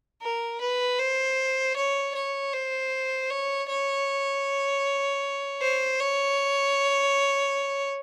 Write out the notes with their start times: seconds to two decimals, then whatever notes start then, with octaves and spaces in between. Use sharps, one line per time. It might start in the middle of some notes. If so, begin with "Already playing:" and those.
0.22 A#4
0.61 B4
1.00 C5
1.76 C#5
2.15 C#5
2.53 C5
3.30 C#5
3.69 C#5
5.62 C5
6.00 C#5